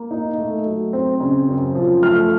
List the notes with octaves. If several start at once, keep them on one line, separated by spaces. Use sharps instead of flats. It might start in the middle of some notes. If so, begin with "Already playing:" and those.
Already playing: A#3
D#4
A3
F#3
C4
C#3
F#2
F3
A3 F6